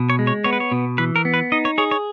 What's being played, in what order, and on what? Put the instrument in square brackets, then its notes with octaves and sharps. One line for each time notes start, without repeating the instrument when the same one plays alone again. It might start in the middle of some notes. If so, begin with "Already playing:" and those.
Already playing: [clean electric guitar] B2
[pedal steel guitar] C#5
[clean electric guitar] G#3
[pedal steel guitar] C#5
[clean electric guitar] B3 [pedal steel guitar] C#5
[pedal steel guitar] B4
C#5
[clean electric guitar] B2
[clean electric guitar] E3 [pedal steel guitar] B4
[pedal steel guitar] A#4
[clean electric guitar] B3
[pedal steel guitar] B4
[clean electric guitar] D#4 [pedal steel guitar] D#5
[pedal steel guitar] C#5
[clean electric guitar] G#4 [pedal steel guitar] C#5
[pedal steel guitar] C#5